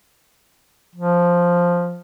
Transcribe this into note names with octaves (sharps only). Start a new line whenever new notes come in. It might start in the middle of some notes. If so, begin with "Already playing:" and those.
F3